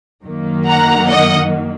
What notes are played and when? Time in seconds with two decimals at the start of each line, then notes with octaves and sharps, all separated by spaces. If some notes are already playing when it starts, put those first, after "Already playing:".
0.24 F#2 D#3 F#3 A#3
0.67 F#5 A#5
1.09 D#5 F#5